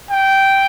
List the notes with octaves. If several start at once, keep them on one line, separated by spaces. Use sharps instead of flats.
G5